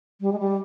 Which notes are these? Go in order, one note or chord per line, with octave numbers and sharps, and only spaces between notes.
G3
G#3
G3